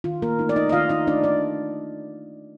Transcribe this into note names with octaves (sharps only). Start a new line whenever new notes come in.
D#3 F4
A#3 A#4
A3 D#4
D5
D#4 D#5
D#5
D#3 F4 F5
D#4 D#5
A3 D4 D#4 D5
D4 D5